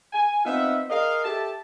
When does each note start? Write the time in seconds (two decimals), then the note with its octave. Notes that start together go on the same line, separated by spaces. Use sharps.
0.13 G#5
0.45 B3 C4 D#4 F4 E5 F#5
0.89 G#4 A#4 D5 D#5 F5
1.24 G4 A4 E5 A5